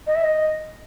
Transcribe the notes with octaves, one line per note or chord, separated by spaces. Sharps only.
D#5
E5
D#5